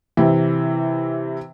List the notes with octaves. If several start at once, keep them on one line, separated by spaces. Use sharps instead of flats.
C3 E3